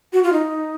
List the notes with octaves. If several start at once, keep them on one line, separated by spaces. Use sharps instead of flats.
F#4
F4
D#4